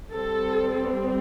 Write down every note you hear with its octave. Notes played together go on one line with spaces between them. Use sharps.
G3 C4 A4